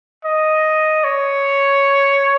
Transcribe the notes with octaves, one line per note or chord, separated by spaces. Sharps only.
D#5
C#5